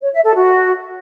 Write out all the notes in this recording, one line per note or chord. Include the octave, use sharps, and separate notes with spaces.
C#5
E5
A4
F#4